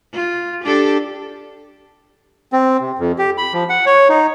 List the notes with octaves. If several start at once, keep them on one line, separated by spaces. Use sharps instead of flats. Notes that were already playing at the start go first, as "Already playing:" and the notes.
F4
D4 G4 A4
C4
C3
F2
G4
B5
F3
F#5
C#5
D#4